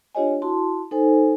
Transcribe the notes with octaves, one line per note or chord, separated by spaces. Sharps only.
D4 F4 G4 C#5 D#5 G#5
E4 F#4 A5 C6
D#4 A4 C5 G#5